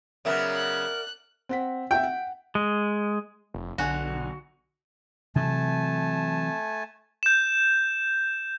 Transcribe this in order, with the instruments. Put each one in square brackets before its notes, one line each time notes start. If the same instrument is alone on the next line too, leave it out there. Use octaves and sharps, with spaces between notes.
[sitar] C#3 F#3 B3 [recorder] A#4 [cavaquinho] D5 E5 F#5
[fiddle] F#6
[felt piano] C4 F#5 B6
[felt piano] E5 F#5 [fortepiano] G5
[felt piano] F#5
[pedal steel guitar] G#3
[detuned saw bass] F1
[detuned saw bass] B1 [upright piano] D3 G#5 [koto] F#4
[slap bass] C3 E3 F#3 [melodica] A3 G#5 A5
[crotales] G6 E7